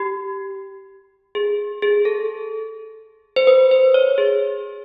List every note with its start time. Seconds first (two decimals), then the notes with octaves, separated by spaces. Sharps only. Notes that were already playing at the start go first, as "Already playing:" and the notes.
Already playing: G4
1.35 G#4
1.82 G#4
2.05 A4
3.36 C5
3.47 B4
3.71 C5
3.94 C#5
4.18 G#4